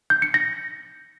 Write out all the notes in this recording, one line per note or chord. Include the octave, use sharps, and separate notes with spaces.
G6
C#7
A#6